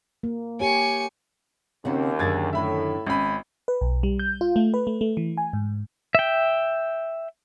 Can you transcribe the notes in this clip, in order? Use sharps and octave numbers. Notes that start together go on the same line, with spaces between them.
A#3
G4 C#5 G#5 C#7
D#2 C#3 C4 F#5
F#2 D3 D#3 G#4 G#6 A6
A2 E5 B5
G#1 C#4 B5
B4
B1
G3
G6
F4
A3
B4
A3
A3
E3
G#5
G#2
E5 G5